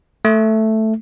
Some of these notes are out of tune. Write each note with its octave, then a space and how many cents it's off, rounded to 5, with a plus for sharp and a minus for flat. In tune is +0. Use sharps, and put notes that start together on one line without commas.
A3 +0